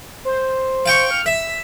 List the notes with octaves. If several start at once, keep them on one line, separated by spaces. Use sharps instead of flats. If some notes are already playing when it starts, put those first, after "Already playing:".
C5
F5 G5 C#6
F6
E5 B6